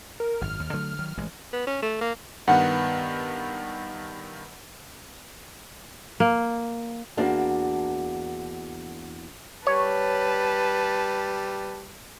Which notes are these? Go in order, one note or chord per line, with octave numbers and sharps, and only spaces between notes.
A#4
G#1 F#2 F6
D#2
D3 F#3 A3
D#3 F#3
A1 E3 G#3
B3
C#4
A3
A#3
G2 D#3 B3 F#5
A#3
E2 A#3 D4 F#4 A5
G3 B4 C#5 A5